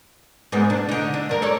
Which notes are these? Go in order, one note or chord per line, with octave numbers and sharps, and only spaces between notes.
G#2 A#3 B3
D4
D3 D#4
D4
G2 A#4
A4 C#5 D5